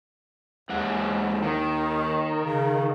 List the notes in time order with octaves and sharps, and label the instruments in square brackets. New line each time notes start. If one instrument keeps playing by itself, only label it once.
[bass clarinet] D#2 [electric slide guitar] G#2 E3 F#5
[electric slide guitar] D#3
[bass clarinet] C#3